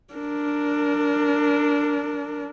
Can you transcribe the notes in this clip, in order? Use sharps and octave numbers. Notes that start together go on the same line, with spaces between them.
D4 A#4